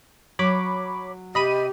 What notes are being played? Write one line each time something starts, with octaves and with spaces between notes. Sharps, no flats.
F#3 C#5 B5 D6
C3 G4 D#5 B5 D#7